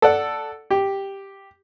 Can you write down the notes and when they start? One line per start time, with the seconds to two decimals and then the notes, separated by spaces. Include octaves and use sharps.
0.02 A4 D5 F#5
0.70 G4